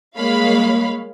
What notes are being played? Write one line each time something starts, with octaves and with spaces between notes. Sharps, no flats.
G3 G#3 A#3 C#5 F5 B5